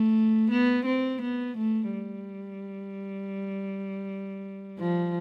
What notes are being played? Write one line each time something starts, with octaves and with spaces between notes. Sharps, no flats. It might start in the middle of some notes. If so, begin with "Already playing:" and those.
Already playing: A3
B3
C4
B3
A3
G3
F3